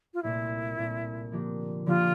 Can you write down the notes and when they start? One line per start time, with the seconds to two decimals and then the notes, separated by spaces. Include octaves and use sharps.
0.14 F4
0.23 C2 A#2 A3 E4
0.77 C2 A#2 A3
1.32 D3 F3 A#3 D4 G4
1.86 D3 F3 A#3 D4 F4 G4